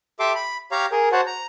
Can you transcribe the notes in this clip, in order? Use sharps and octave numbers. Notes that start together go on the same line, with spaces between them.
G4 A4 E5 C6 D6
B5
G4 C#5 F5 A#5
G#4 A#4
F#4 C5 C#5 F#5 A5
A#5